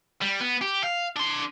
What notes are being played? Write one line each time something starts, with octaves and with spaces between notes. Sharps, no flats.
G3
B3
G4
F5
D4 C6